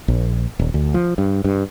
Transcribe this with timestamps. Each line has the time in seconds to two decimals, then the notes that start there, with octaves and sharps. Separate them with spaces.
0.08 A#1
0.59 D#1
0.74 D2
0.94 F3
1.18 G2
1.44 G2